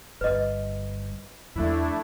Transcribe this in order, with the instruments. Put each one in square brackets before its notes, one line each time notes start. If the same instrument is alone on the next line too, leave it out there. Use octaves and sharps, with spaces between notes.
[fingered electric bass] G1 G2 [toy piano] B4 D#5
[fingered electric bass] E2 F3 [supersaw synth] A3 D4 E4